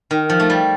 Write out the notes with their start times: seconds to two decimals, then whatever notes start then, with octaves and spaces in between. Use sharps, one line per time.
0.11 D#3
0.29 F3
0.40 A3
0.50 G3